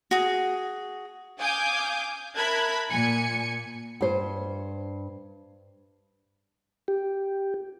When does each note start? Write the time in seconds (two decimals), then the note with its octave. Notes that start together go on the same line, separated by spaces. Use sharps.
0.11 F#4 G#4
1.40 F5 G#5 D6 D#6 G6
2.36 A#4 E5 A5 B5 F#6 G#6
2.89 A#2 G#5 C#7
4.01 G2 C5
6.88 G4